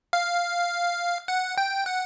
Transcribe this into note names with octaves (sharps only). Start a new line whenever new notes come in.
F5
F#5
G5
F#5